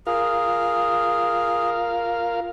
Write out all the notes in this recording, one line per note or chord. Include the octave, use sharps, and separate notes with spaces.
F4 G#4 A#4 F5